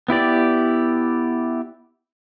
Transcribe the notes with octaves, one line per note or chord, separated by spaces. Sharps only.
B3 E4 G4 D5